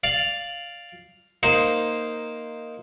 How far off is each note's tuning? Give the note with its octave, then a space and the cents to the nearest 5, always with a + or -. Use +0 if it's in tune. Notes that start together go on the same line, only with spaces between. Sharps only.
D5 +0 F5 +0
A#3 +0 D#4 +5 C5 +0